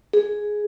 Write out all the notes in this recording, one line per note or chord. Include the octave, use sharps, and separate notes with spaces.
G#4